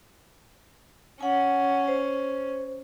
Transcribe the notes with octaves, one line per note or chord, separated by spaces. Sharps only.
C#4 F#5 G#5
C5